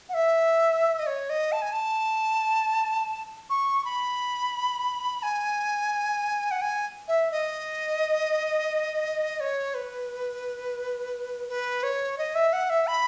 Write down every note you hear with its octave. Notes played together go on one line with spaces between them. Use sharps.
F#5
E5
D#5
C#5
D#5
A5
G#5
A5
C#6
B5
G#5
F#5
G#5
E5
D#5
C#5
B4
B4
C#5
D#5
E5
F#5
E5
B5